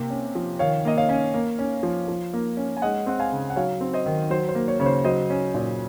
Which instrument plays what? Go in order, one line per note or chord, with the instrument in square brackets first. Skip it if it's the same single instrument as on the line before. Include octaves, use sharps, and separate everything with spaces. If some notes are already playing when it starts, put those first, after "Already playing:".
Already playing: [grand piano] C3 A#3
C#4
F3
D#3 C#5 F5
A#3 D#5
C#5 F5
C#4
A#3
C#4
F3
F3
A#3
C#4
G#5
G#3 D#5 F#5
C4 F#5
F5 G#5
C#3
F#5
F#3 C#5 F5
C4
C5 D#5
D#3
F#3 C5
C5
A#3
C#5
C#3 C#5
C5
F#3 C5 D#5
C#4
A#2